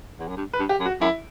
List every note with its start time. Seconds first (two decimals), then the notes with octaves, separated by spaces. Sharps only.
0.19 E2
0.28 F#2
0.37 G2
0.53 B4
0.59 G2
0.69 G4
0.80 F#2
0.86 F#4
1.01 F#2 E4